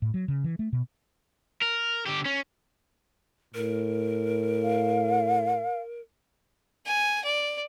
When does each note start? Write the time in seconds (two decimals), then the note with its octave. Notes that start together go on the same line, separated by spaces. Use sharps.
0.02 A2
0.14 F#3
0.28 C#3
0.44 E3
0.59 A3
0.73 B2
1.62 A#4
2.06 D3 G4
2.25 C#4
3.54 A2 A#4
4.63 F5
6.86 G#5
7.24 D5